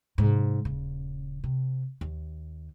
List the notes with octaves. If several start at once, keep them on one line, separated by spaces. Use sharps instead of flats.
G#2 C3
D#1 C#3
C3
D#2